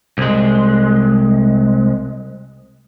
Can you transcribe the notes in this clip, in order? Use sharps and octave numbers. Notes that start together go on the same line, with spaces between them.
C2 G#3